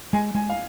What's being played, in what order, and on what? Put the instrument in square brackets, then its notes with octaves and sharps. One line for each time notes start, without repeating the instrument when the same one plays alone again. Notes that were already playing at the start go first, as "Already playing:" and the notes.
[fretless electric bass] G#3 [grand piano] G#5
[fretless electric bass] G#3 [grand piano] G#5
[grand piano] F5